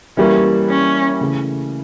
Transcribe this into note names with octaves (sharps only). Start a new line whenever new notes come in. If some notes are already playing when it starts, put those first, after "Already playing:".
E3 G3 A#3 C#4
C#4
C#3 E3 A3